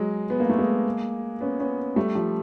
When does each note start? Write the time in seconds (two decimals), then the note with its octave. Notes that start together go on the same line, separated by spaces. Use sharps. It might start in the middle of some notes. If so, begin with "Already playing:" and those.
Already playing: F#3 G#3
0.30 B3
0.40 A#3
0.49 A3
0.58 G#3 A#3
1.41 B3 C#4
1.60 B3 C#4
1.96 G3 A3
2.15 F3 G3